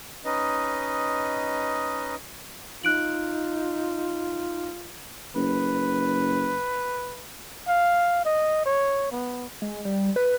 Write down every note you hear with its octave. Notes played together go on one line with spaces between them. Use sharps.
C#4 D#4 B4 D#5
D#4 F4 F#6 D7 F#7
F#1 B4
F5
D#5
C#5
B3
G#3
G3
B4